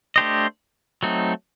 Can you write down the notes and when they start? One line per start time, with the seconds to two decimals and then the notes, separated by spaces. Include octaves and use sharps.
0.16 A3 D4 G4 C5 D#5
1.03 F#3 A3 C4 D#4